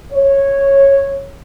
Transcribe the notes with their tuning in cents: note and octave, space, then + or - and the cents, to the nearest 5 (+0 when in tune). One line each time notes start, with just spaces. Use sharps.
C#5 -10